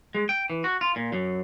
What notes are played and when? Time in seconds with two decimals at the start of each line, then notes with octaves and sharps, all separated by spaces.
0.15 G#3
0.29 G5
0.50 E3
0.64 F#4
0.81 F4
0.96 A#2
1.13 F#2